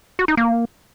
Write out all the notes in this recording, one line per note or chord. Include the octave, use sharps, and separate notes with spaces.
F#4
D#4
A#3